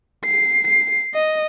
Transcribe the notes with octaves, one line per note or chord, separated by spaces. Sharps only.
C7
C7
D#5